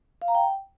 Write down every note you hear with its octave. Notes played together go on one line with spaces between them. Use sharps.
F5
A#5
G5